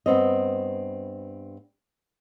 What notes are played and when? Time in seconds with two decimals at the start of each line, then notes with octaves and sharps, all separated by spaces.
0.06 G2 B3 C4 D#5